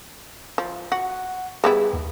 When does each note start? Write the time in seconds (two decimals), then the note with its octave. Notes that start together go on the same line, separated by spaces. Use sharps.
0.58 F3
0.92 F#4 F#5
1.64 G3 B3 E4 G#4
1.93 D#2